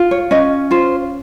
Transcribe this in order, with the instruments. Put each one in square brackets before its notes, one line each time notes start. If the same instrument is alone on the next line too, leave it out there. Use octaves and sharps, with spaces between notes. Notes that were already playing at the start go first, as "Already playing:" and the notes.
Already playing: [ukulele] F4
C#5
C#4 D#5
F4 C5